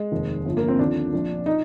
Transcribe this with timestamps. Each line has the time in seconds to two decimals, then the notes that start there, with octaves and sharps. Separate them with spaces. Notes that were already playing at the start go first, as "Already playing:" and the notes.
Already playing: G#3
0.12 F1 D#2 D#3
0.45 G1 G2 F3
0.57 A#3
0.68 C4
0.79 D#2 D3 F3 D4
1.13 A#1 A#2 F3
1.46 D#4